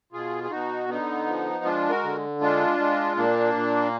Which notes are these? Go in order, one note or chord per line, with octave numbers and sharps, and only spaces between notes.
B2 F4 G#4
G#4
B2 D#4 F#4
D3 B3 D#4
F3
G#3 D4 F4
F#4 A#4
D3
G#3 D4 F4
G#3
A#2 A#3 D4
A#2